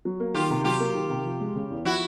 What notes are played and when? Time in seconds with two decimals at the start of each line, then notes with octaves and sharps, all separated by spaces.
0.05 F#3
0.20 A#3
0.34 D#3 F4 G4
0.50 C3
0.64 F#3 F4 G4
0.80 A#3
0.95 D#3
1.10 C3
1.25 F3
1.40 G#3
1.56 C#3
1.70 E2
1.85 F3 E4 F#4